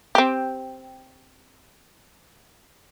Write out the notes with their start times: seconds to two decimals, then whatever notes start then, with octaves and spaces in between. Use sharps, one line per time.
0.15 C4 G4